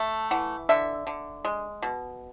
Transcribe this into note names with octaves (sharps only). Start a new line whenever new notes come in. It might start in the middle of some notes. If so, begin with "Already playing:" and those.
Already playing: A3 A5
E3 F#5
D3 E5
D3
G#3
B2